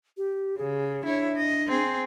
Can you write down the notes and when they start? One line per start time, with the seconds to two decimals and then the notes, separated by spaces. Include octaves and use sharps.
0.17 G4
0.58 C#3 G#4
1.05 D4 E4 C#5
1.36 D#5
1.68 C4 G#4